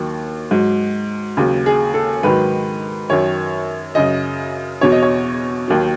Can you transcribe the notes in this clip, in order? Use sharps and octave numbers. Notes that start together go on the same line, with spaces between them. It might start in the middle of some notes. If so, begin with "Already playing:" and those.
Already playing: D#2 D#3 F#3
G#2 F#3
D#2 C#3 F#3
G#4
A4
G#2 D#3 F#3 B4
F#2 D#3 F#3 C#5
F#2 C#3 F#3 D#5
E2 B2 F#3 C#5
D#5
C#5
D#2 D#3 F#3